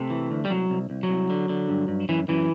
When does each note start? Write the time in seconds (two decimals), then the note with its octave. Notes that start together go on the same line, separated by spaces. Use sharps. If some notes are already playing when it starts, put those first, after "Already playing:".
Already playing: C3 A3
0.10 E3
0.31 D2
0.45 G3
0.50 C2 F#3
0.70 C2
0.90 C2
1.03 F#3
1.09 C2
1.30 D3
1.49 D3
1.68 G2
1.88 G2
2.09 F#2 E3
2.28 F#2 E3